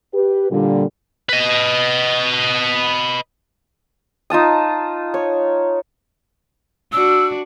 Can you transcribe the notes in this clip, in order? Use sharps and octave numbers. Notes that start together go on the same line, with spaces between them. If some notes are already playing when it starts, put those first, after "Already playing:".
G4 B4
A#2 D3 G3
B4 D#5
D#4 F4 A5 D#6
C#5
D4 F#4 E6